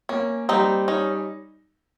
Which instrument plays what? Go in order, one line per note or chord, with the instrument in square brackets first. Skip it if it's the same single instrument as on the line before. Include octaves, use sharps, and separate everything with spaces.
[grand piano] A#3 [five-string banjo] C#4
[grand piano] G3 [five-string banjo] C4 D#4
[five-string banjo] C#4 [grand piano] D#4